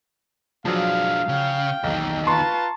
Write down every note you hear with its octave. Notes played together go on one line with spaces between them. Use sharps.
F3 F#3 G#3 D4 F5
C#3 G5
B1 E2 D#3
F4 B4 A5 A#5 C6 C#6